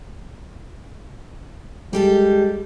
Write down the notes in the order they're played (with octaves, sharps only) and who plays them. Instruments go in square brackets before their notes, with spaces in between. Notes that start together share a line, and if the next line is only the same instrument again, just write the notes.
[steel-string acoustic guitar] G3 G4 A4 [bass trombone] G#3